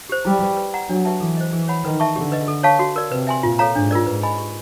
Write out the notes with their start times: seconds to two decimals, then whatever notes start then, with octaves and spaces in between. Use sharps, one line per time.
0.09 G4 C5
0.25 G3 E4
0.42 G4 B4
0.57 B4
0.73 D5 F#5 A#5
0.88 F#3 D4
1.05 G4 B4 E5 A5
1.20 E3 A4
1.37 C5 D#5
1.52 E3 G#4
1.68 C#5 F#5 B5
1.84 D#3 B4
2.00 E5 A5 C#6
2.16 D3 G4
2.32 B4 D#5
2.48 A4
2.63 C#5 F5 A5 C#6
2.79 F#4
2.96 A#4 D5
3.11 C3 B4
3.27 E5 G#5 C6
3.43 A#2 F4
3.59 A4 C#5 F5 A#5
3.75 G#2 D4
3.91 F4 A#4 D5
4.06 G#2 B4
4.23 D#5 G#5 B5
4.38 G4